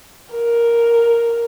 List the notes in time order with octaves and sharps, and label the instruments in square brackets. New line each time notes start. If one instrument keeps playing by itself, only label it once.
[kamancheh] A#4